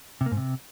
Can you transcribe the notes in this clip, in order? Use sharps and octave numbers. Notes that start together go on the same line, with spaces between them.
C3
A#3
G#2
C3